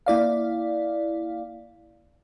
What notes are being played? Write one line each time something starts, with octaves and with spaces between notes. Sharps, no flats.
A#3 E4 D5 F5